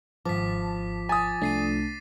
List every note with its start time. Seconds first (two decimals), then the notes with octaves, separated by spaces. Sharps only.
0.25 G#1 F3 A5 D6 B6
1.09 G#5 D#6 A6
1.42 C2 A3 D4 A6 C7 D#7